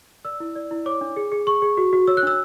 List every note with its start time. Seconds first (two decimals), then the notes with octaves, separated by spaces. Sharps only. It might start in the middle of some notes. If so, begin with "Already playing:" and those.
0.25 D5 E6
0.40 E4
0.56 D5
0.71 E4
0.86 C#5 D6
1.01 D4
1.16 G#4
1.32 G#4
1.47 G#4 C#6
1.62 G#4
1.77 F#4
1.93 F#4
2.07 C#5 E6
2.17 F#6
2.23 D4 E6